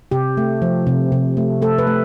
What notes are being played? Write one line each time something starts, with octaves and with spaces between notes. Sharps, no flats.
C3 G4
A3
F3
C3
C3
A3
A3 A4
B4
A3